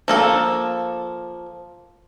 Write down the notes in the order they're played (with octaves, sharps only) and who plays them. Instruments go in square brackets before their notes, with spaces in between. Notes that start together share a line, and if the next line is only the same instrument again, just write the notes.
[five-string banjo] F3 A#3 A4